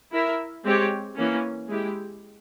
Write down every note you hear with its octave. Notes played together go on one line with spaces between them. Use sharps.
E4 A#4 E5
G#3 C4 G4 C#5
E3 A#3 C#4
G#3 E4 G4